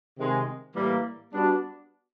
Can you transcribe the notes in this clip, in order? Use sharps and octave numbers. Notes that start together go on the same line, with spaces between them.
C3 D#3 G#3
A2 E3 G3 A#3
G3 B3 D4 F#4